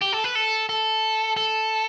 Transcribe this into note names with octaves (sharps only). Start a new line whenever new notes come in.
G4
A4
B4
A4
A4
A4